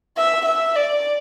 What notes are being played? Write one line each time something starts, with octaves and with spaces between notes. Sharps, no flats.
E5
E5
D5